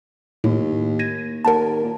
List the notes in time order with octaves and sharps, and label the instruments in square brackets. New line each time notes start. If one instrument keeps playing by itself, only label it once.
[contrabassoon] D#2 [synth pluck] A2
[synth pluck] G#6 A#6 D#7
[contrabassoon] D#2 [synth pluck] A#4 F#5 A5
[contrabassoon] A#2